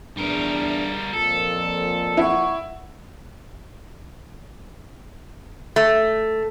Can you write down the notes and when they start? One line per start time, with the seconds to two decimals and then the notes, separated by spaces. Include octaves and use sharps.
0.17 E2 G3 D4 A#4
1.13 F2 A#2 F3 A4
2.17 E4 F#5 C#6
5.76 A3